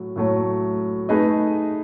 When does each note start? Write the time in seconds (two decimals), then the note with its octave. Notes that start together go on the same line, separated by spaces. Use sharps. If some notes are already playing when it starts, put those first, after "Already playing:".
Already playing: A2 F#3
0.16 A2 F#3 A3
1.09 A3 D#4 G#4 B4 D#5